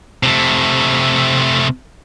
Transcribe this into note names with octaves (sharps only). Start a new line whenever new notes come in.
C3 A3